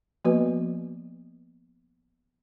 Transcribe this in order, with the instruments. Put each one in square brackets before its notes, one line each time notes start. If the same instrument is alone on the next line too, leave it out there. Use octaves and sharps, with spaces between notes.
[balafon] F3 A#3 B3 F#4 B4 D#5